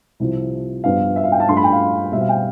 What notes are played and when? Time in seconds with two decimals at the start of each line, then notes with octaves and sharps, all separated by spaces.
0.20 C2 C3 F3
0.84 G2 F3 B3 D4 F5
1.16 E5
1.24 F5
1.32 G5
1.40 A5
1.48 G2 F3 A3 D4 C6
1.57 B5
1.64 G5
1.73 F5
2.12 B2 G3 C4 E5
2.21 F5
2.29 G5